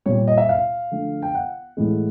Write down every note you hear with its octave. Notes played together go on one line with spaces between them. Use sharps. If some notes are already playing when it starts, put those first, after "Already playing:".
A#2 G3 C#5
D#5
E5
F5
D3 F3 A3
G5
F#5
A2 E3 G#3